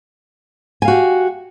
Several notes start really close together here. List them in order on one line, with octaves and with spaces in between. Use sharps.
G#5 F5 F#4 G4